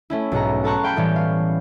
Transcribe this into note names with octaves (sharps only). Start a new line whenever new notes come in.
A3 C#4 E4
B1 G#2 F#5 A#5
A4 A5 A#5 C#6 F#6
F5 G5 B5 C#6 G6
A2 E3 G3 B3 C#4
F5